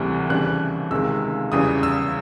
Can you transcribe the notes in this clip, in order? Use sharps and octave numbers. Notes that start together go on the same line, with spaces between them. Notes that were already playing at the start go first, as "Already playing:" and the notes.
Already playing: D2 C3 E3 G3 F#6
D#2 C#3 E3 G3 C4 F#6
C#2 C3 D#3 G#3 E6
E2 C#3 E3 G3 D#6
E6